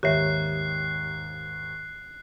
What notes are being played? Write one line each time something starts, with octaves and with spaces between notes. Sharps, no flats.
D#2 G#2 D#3 G4 C#5 E5 F#6 C7